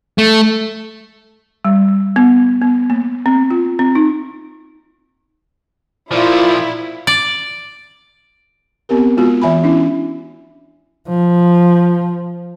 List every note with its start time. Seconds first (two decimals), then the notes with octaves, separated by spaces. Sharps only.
0.18 A3
1.65 G3
2.16 B3
2.62 B3
2.90 A#3
3.26 C4
3.50 F4
3.79 C4
3.95 D#4
6.11 A#2 F3 E4 F4 D5
7.07 D5
8.89 B3 C4 G4 A#4
9.17 G#3 B3 F4 F#4
9.42 E3 E5 G#5 B5
9.64 C#4 D4 E4
11.08 F3